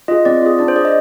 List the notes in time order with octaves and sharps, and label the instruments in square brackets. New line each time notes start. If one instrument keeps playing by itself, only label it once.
[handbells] F4 G#4 D#5
C4 D5
F4 G#4
D4 D5
C5
G#4 D5
D#5